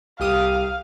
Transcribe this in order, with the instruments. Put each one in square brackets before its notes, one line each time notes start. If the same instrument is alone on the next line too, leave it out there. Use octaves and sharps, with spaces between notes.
[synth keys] C2 G4 D#6 [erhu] F5